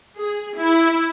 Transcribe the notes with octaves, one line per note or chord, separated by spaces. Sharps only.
G#4
E4